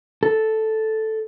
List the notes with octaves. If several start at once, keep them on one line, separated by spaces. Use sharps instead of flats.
A4